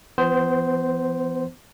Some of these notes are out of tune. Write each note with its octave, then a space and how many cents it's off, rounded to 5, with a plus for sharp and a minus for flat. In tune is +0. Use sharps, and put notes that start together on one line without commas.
E3 +45 B3 +30 C5 -5